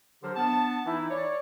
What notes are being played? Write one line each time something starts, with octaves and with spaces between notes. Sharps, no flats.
D3 F#3 D4 G4 A#4 C5
B3 D4 A5
E3 D#4 E4
C#5 D5